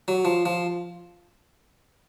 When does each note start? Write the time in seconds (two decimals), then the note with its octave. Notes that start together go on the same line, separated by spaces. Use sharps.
0.08 F#3
0.25 F3
0.46 F3